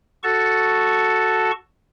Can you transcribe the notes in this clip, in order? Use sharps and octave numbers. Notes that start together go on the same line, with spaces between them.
F#4 A4 A5 C#6